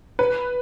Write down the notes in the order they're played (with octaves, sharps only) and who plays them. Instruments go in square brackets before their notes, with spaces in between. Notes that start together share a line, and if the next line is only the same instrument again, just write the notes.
[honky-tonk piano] B4